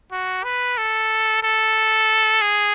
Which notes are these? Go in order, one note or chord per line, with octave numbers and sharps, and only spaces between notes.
F#4
B4
A4
A4
G#4